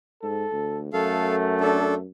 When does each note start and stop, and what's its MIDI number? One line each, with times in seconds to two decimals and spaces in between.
0.23 0.45 44
0.23 0.80 69
0.52 0.89 38
0.93 2.07 42
0.93 1.98 57
0.93 1.35 69
0.93 1.35 77
1.61 1.94 62
1.61 1.94 69